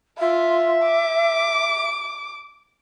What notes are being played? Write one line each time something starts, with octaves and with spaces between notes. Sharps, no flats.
F4 E5
D6